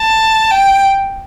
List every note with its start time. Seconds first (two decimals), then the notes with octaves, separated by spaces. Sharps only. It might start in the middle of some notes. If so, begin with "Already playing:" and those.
Already playing: A5
0.51 G5